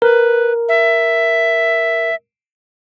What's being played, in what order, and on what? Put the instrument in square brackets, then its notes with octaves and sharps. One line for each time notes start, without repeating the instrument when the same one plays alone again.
[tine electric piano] A#4 [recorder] B4
[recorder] E5